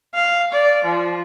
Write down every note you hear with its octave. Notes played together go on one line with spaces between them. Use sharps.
F5
D5
F3